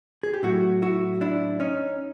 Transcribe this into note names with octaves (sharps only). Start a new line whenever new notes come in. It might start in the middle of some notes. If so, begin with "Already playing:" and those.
G#4
G4
A2 F#3 A3 E4 F#4
E4 F#4
D4 E4
C#4 D#4